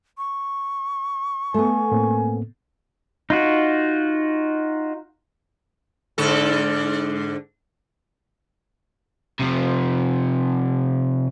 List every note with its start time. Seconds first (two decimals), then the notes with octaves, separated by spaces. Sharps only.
0.18 C#6
1.54 A3 B3 A4 G#5
1.92 A2 A#3 C4
3.30 D#4 F4 F#4
6.18 G#2 D3 A4
9.39 C3 F3